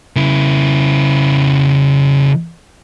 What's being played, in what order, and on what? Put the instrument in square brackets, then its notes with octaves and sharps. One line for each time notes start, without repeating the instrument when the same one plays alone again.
[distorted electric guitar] C#3 E4